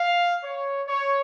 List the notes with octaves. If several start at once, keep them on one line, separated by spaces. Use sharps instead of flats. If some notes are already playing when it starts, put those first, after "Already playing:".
Already playing: F5
C#5
C#5